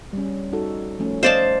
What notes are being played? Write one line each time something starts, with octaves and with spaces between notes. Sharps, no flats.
G3 C#4
D#4 F#4 A4
F3 A3 C#4
C5 D5 D#5 F5 A5